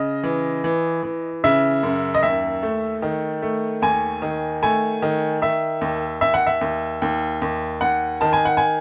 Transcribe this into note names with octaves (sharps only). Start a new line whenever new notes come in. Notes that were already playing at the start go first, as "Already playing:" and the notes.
Already playing: C#3 D#5
E3
E3
E3
C#3 E5
F#2
D#5
D#2 E5
A3
D#3
A3
D#2 G#5
D#3
A3 G#5
D#3
D#3 E5
D#2
D#2 E5
F#5
E5
D#2
D#2
D#2
D#2 F#5
D#3 A5
G#5
F#5
G#5